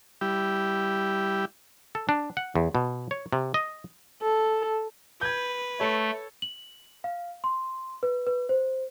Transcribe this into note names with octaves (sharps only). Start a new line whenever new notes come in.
G3 E4 G4
A4
D4
F#5
E2
B2
C#5
C3
D#5
A4
B4 G6 G#6
A3 A4 C#5
F#7
F5
C6
B4
B4
C5